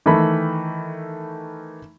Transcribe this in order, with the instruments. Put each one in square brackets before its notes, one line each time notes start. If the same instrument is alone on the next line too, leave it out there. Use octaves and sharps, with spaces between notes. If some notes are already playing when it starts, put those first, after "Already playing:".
[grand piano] D#3 E3 A3 E5 B5